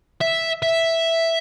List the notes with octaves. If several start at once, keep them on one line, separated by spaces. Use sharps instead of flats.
E5
E5